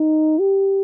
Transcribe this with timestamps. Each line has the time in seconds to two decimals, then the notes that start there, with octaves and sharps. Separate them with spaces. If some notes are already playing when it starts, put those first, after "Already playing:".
Already playing: D#4
0.39 G4